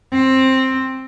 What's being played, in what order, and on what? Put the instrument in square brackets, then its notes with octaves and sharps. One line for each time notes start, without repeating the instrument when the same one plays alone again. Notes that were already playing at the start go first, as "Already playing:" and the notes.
[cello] C4